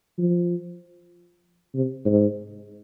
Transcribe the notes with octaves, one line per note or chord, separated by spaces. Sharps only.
F3
C3
G#2